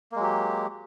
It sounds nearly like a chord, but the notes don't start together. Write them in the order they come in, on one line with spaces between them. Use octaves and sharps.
A#3 G#3 F#3 G4